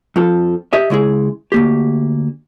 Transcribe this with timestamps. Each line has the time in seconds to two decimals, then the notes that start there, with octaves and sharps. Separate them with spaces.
0.16 F2 F3 A4
0.73 G4 D#5 E5
0.90 C#3 G#3 E4 G#4
1.52 D2 A#3 G4